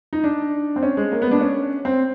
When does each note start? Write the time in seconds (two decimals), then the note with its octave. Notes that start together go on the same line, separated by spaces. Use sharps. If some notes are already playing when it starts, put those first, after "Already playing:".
0.13 D#4
0.24 D4
0.76 C4
0.83 C#4
0.97 G#3
1.12 A#3
1.22 B3
1.31 D4
1.41 C#4
1.85 C4